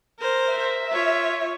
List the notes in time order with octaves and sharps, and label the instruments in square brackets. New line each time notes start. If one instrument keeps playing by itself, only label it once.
[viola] A#4 C5
[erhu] E5
[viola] F4 C#5